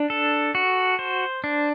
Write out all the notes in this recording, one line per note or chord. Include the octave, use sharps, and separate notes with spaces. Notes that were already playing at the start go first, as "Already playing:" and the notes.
Already playing: D4
A4
F#4
C5
D4